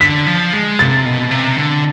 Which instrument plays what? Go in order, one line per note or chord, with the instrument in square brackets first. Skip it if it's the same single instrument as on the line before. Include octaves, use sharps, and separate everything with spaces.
[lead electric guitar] D3 [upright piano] B6
[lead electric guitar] F3
G#3
[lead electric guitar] C3 [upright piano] A6
[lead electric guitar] B2
C3
D3